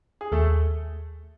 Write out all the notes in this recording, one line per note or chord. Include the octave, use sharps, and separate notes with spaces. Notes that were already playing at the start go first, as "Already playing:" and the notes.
G#4
D#2 A3 A4